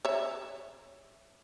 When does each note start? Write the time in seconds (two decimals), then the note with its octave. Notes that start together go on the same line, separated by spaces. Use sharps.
0.05 C#5 E5